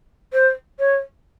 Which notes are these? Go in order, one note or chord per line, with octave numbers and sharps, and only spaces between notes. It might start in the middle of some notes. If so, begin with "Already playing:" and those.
C5
C#5